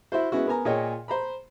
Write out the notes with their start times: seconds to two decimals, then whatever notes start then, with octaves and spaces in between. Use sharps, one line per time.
0.12 E4 F#4 C5
0.32 G#3 B3 C#4 E4 F#4
0.47 B3 A#4 G#5 A#5
0.65 A#2 G#4 C#5 D#5 G5
1.08 C5 A#5 B5